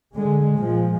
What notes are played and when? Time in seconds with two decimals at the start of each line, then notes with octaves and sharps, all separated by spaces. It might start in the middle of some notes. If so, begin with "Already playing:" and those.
0.13 D3 G#3
0.56 A#2 F3 G#3